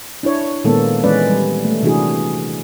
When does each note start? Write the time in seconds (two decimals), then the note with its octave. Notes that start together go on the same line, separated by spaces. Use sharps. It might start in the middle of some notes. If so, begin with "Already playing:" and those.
0.23 D4 E4 C#5
0.64 A#2 D#3 G#3 A#3 B3 A4
1.04 E3 G#3 C#4 B4 D5
1.28 G3
1.65 A3
1.83 C3 E3 D4 E4 F#4 G#4